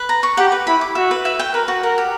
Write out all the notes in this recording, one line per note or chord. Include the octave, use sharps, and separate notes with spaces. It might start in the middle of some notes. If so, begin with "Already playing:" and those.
Already playing: B4
A#5
C#6
G4 F#5
B4
E4 B5
D6
F#4 E5
B4
E5
G5
A#4 B4
F#4
A#4 F#5
G4